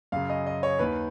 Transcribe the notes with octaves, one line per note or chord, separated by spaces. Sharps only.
F#2 C#3 F5
D#5
D#5
C#5
D#2 D#3 B4